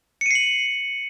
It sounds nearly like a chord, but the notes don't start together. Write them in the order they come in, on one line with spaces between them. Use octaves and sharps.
C#7 D#7 C7 F#7